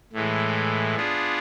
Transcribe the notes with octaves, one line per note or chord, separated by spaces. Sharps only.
A2 E3 G#3
B3 D4 F4 G#4